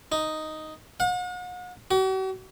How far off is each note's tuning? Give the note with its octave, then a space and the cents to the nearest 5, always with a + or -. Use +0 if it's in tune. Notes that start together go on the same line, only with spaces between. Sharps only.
D#4 +0
F#5 -45
F#4 +45